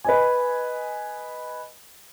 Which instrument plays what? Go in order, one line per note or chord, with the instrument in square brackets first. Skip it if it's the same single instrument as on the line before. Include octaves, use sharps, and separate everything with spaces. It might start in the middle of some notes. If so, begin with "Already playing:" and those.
[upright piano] B4 D#5 G#5